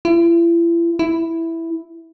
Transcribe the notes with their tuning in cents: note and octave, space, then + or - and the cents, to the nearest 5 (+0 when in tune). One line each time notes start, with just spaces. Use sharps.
E4 +40
E4 +0